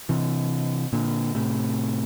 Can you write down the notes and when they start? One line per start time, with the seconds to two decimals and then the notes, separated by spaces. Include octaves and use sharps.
0.09 C3 E3
0.93 A#2 D3
1.35 A2 C3